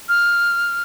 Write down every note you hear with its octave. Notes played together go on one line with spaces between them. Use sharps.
F6